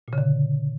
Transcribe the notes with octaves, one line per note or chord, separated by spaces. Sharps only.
A#2
C#3
D3